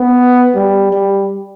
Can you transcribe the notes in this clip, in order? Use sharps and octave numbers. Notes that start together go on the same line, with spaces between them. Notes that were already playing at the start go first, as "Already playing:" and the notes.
Already playing: B3
G3
G3